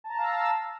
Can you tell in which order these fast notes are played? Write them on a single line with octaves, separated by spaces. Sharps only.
A5 A#5 A6 F5 E6